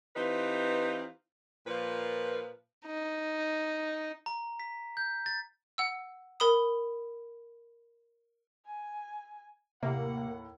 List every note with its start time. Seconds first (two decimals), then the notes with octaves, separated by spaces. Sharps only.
0.16 E3 C4 D#4 F4 G4 B4
1.67 A#2 F3 B4
2.86 D#4
4.26 A#5
4.60 B6
4.97 G6
5.26 A6
5.78 F#5 E6
6.40 A#4 B5 D#6
8.66 G#5
9.83 D#2 A2 C3 A#3 F#5